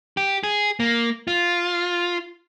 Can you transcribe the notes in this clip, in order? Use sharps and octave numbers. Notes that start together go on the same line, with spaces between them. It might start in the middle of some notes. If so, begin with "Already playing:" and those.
G4
G#4
A#3
F4